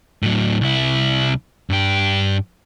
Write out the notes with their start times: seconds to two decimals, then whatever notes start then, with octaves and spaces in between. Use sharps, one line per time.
0.23 A2 F#3
0.61 C2 E4
1.70 G2 G4